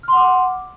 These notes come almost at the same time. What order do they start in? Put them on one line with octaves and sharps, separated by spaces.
F6 C6 F#5 D6